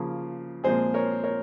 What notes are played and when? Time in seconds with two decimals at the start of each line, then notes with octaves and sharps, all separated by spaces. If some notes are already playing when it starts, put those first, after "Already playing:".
Already playing: C#3 F3 A#3
0.64 A#2 F3 G#3 C4 G#4 C5
0.94 A#4 C#5
1.24 A#4 C#5